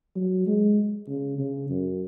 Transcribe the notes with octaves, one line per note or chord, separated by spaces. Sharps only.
F#3
G#3
C#3
C#3
F#2